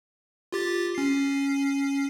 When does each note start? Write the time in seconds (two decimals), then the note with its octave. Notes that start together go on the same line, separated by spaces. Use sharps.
0.52 F4 G4 A6
0.95 C#4 C7